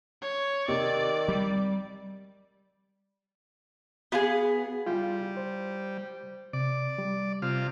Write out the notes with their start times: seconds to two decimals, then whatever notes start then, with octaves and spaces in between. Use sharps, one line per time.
0.22 C#5
0.68 C3 D#3 D5
1.29 G3
4.12 B3 F#4 G#4 F5 G#5
4.86 G3 E4 F4
5.37 C5
6.53 C3 D5
6.98 G3
7.42 C3 F4